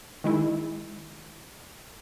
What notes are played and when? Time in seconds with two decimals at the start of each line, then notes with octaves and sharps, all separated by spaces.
0.24 D#3 G#3 E4